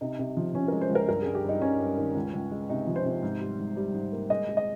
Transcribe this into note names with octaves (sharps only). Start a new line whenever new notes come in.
C3 D#4
C3
F3
F3 C#4
G#3 A#4
C5
C#2
A#4
G2 A#4
G2 G#4
G4
G2 D#4
G2 C#4
G2
D#3
C#2
C#2
G#3
C3 D#4
F3
C5
C3
G#2
G3
G#2
G3
G#2
A#3
G#3 D#5
G#3
D#5